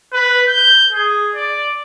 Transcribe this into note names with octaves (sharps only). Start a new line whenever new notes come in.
B4
G6
G#4
D5